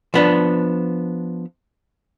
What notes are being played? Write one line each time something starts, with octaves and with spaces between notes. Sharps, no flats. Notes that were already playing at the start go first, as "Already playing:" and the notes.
F3 B3 D4